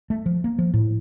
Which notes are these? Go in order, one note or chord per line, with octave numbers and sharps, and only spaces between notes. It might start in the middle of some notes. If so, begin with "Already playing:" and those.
A3
F3
A#3
F3
A2